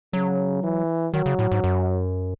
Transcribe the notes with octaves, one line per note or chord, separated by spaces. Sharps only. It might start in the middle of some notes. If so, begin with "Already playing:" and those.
C#3 F#3
E3
D#3 F#3
C#3
A2
G#2
F#2